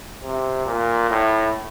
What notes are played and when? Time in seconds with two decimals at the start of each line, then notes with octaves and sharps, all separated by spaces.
0.22 C3
0.66 A#2
1.10 A2